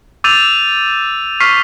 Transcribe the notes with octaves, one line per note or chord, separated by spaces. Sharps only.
D6 E6 G6 A6 D#7 F7
C#6 F6 B6 C7